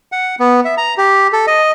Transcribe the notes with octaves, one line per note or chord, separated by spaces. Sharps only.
F#5
B3
E5
A#5
G4
A4
D#5